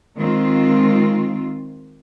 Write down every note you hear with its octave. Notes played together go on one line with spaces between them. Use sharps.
D#3 G#3 C4 F4